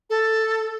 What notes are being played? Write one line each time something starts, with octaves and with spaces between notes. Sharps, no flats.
A4